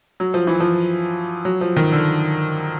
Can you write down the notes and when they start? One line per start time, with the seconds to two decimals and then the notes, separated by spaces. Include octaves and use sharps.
0.20 F#3
0.34 F3
0.47 E3
0.60 F3
1.45 F#3
1.61 F3
1.76 D#3
1.92 D3